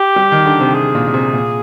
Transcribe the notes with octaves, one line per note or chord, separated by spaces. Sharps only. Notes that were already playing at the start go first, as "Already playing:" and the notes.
Already playing: G4
G3
D#3
D3
C3
G#4
A#2
A#2
C3
A#2